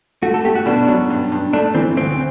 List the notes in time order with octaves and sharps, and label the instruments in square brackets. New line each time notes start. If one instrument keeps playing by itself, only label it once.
[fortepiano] A3 [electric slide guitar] F#4
[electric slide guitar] A4
[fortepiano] A3 [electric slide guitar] G4
[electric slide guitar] F#4
[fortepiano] B2 [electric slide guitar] D4
[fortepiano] F#3
G2
G2
[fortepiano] A3 [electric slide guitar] D4
[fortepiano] E3 [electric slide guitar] C4
[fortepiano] D2 [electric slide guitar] C4